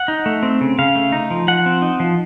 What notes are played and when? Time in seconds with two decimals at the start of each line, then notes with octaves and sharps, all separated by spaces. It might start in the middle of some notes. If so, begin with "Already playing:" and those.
Already playing: F#5
0.08 D#4
0.26 A3
0.43 C4
0.61 C#3
0.79 C#3 F5
0.95 A3
1.12 D#4
1.31 F3
1.48 F3 F#5
1.66 C4
1.82 D#4
2.00 F3